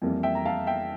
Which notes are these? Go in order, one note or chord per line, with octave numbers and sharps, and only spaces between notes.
F2 E3 G3 A#3
E5 G5
A#5
F5 A5
E5 G5